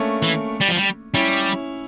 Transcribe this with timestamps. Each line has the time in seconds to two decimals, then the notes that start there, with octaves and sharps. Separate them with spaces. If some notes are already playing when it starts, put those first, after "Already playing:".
Already playing: A3 A#3 C#4 D4
0.23 E3
0.61 G3
0.68 F3
0.76 G3
1.14 G3 C#4 E4